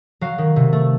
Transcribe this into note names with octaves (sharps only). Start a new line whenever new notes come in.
F#3 F5
D#3
C3
A3